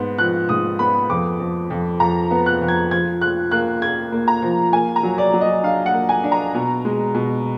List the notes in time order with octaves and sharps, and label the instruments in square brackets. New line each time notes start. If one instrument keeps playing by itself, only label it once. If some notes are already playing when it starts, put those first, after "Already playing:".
Already playing: [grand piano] G#2 B3
F3 F#6
G#2 D#6
B3 B5
F2 D6
F2
F2
F2 A#5
B3
F#6
F2
G#6
F3 G#6
F3 F#6
A#3 F#6
A#3 G#6
A#3
A#5
F3
A#3 G#5
A#5
F#3
D5
F#3
D#5
D4 F5
F#5
A#3
G#5
D4
A#5
B2
G#3
B2